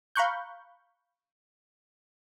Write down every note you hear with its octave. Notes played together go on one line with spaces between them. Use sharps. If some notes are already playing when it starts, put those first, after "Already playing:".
F5 A#5 B5 C#6 F#6 G6